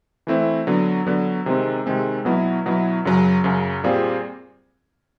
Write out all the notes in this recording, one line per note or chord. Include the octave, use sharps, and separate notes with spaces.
E3 A3 C4 E4
D3 F#3 B3
D3 F#3 B3
C3 D#3 G#3 C4
C3 D#3 G#3 C4
B2 F#3 B3 E4
B2 F#3 B3 E4
F#2 C#3 F#3
F#2 C#3 F#3
A#2 G3 C4 F4 G#4